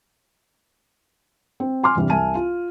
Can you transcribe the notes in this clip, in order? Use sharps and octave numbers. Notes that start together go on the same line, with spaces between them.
C4
G#5 C6 D6 F6
E2 G2 C3 E3
C2 E5 G#5 A5 D#7
F4